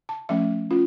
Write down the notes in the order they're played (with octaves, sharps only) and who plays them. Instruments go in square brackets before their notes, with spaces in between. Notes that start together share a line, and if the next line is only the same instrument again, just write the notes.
[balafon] A5
F3 A3 C#4 E5
C#4 F4